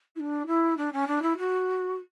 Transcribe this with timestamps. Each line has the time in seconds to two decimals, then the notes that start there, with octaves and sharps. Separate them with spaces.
0.15 E4
0.19 D4
0.47 E4
0.77 D4
0.92 C#4
1.07 D4
1.22 E4
1.37 F#4